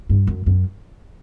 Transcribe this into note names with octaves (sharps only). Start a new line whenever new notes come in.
G2
F#2
F#2